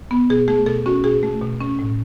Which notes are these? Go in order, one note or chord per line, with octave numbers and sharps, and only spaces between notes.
B3
B2 G#4
A3 G#4
B2 A4
C#4 F#4
B2 G#4
A3
B2
C#4
A2